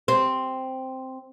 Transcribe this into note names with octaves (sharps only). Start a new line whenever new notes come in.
C4